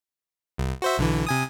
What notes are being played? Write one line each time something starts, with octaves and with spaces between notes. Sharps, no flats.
C2
F#4 C5 E5
B1 D3 E3
C3 G#5 D#6